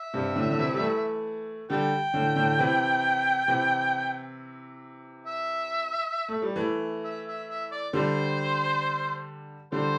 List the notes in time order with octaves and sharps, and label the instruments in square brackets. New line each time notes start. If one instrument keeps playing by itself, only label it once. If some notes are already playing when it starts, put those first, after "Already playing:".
Already playing: [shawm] E5
[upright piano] G2 C3
A2 D3
D3
C3 E3
G3
E3 A3
[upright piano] D3 G3 [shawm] G5
[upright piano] A2 D3
A2 D3
C3 E3
C3 E3
[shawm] E5
[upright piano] A3
G3
E3 A3
[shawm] E5
E5
E5
D5
[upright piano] D3 G3 [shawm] C5
[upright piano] D3 G3 [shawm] C5